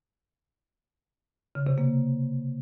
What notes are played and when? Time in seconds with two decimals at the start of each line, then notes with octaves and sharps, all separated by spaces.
1.55 C#3
1.67 C3
1.78 A#3